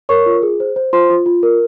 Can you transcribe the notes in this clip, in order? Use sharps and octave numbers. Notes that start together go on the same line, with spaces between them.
A#4 C#5 C#6
F4
G#4
C5
C5
F4 C5 C6
F4
F4
A#4